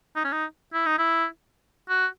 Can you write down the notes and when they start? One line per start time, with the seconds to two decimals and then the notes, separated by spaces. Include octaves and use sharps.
0.16 D#4
0.24 C#4
0.32 D#4
0.73 E4
0.86 D#4
0.98 E4
1.89 F#4